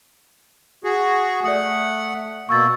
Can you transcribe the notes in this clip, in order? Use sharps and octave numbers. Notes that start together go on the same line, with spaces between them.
F#4 G#4
A3 D5 F#5 D#6
B2 A#3 C#6 E6 A6